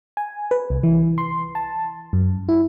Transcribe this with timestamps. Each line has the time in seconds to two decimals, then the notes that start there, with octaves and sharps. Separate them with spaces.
0.17 G#5
0.51 B4
0.70 C2
0.83 E3
1.18 C6
1.55 A5
2.13 F#2
2.49 E4